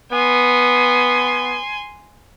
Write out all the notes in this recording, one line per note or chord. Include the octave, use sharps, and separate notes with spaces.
B3 G#5 C6